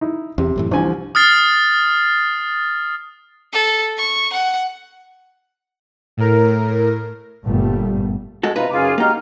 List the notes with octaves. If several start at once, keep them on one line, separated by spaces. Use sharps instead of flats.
D#4 E4
E2 C3
F#2 A2 E3
C2 D3 E3 F3 G#5
D#6 F6 A6 C7
A4
C#6
F#5
A2 A#4
G1 G2 A#2 G3 A3
G#3 F#4 A4
C3 D#4 F4 B4 A#5
F#2 C#3 F4 G#4 G#5 D6
G#3 A#3 D#4 F#4 G4 A#5 F6